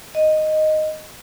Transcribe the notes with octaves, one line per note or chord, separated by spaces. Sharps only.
D#5